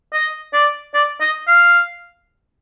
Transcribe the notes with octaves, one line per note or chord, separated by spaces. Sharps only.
D#5
D5
D5
D#5
F5